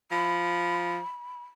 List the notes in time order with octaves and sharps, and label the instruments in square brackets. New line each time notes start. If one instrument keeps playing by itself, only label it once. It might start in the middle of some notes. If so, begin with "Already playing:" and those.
[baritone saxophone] F3 [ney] B5